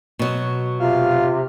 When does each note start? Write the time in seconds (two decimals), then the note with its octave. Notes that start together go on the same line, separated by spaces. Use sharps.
0.19 B2 F#3
0.80 C3 F4 F5